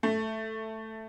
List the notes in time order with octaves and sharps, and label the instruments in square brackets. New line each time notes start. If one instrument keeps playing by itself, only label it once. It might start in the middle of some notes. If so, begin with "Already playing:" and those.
[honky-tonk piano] A3